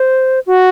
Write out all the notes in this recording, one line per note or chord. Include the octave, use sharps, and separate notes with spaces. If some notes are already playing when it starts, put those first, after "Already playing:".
Already playing: C5
F#4